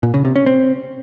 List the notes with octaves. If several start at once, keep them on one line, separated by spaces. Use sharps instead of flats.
A#2
C#3
C3
C#4
C4